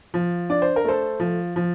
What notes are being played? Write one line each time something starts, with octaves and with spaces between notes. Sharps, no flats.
F3
D4 D5
C5
A#4
A3 A4 C5
F3
F3